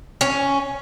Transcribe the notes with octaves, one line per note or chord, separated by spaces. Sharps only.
C#4